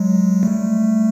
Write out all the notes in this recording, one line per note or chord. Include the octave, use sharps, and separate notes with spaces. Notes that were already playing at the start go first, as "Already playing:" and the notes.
Already playing: F#3 G#3
G3 A3